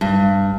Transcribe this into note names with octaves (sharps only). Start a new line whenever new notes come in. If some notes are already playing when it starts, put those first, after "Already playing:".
G2